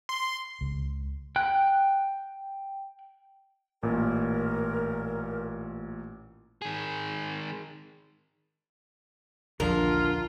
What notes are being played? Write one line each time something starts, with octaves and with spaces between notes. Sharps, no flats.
C6
C#2
G5 F#6
A1 A#2 A#4
D#3 G#4
A#1 D#2 D3 F3 D4 F4 A#4